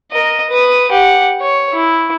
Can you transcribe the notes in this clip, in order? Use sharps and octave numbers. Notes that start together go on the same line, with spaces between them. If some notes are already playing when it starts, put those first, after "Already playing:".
A#4 D#5
B4 D#6
G4 F#5
C#5
E4